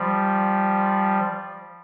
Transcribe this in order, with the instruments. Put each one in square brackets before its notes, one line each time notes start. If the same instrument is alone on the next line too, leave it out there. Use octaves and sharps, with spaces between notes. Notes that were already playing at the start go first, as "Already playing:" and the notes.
Already playing: [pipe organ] F3 G3